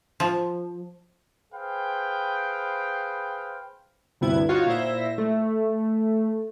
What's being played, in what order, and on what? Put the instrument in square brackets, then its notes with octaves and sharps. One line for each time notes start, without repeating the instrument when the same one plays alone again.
[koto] F3
[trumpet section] G#4 B4 C5 F5 G5
[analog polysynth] D2 G2 C3 B3 E4 G#6
D#4 F4 F#4 C#5 F5
A#2 E4 C5 E5 A#6
A3